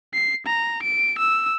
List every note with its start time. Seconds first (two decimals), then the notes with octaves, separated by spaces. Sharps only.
0.14 C7
0.47 A#5
0.83 D7
1.18 E6